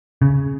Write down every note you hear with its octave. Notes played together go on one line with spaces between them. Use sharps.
C#3